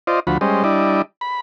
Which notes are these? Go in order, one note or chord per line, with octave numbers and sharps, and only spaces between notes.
F4 C5 D5 D#5
D2 F3 F#4 B5
G3 G#3 C#4 C5 D#5
G3 D4 E4 D5 D#5
B5